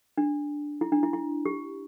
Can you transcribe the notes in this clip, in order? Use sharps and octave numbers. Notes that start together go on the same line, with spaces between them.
D4
E4
D4
E4
E4
G4